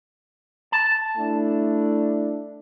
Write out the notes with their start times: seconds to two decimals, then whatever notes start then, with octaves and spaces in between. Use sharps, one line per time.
0.72 A5
1.17 A3 D4 E4